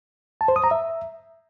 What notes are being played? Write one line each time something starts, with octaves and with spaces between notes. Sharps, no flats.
A5
C5
D#6
A#5
E5